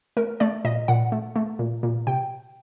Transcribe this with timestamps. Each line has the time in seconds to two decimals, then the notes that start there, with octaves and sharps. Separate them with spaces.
0.17 A3 A#4
0.40 A3 D5
0.65 A#2 D#5
0.88 A#2 F#5
1.12 A3
1.36 A3
1.59 A#2
1.83 A#2
2.07 C3 G5